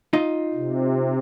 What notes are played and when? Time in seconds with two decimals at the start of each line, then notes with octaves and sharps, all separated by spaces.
0.13 D#4 F4 D#5
0.54 C3